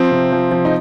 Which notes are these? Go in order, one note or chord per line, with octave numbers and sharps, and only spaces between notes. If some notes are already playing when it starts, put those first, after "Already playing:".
Already playing: F3 C4
C3
F3
F3
D#4